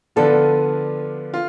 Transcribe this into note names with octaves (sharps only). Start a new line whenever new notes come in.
D3 F3 B3 D4 F4 A4
F4